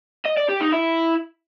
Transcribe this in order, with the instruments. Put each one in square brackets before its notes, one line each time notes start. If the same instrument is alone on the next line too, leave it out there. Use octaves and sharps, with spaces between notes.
[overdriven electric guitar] D#5
D5
G4
D#4
E4